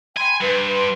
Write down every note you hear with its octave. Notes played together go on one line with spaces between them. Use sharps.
G5 G#5 B5 C6
G2 B4 C6